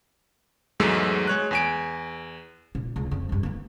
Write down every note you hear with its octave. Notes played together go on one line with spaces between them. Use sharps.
E2 G#2 F#3 G#3 A3 E6
G#3 C#5 F#6
E2 G#5 D7
A#2
C#2
F2
G#1 G2
A#3 B3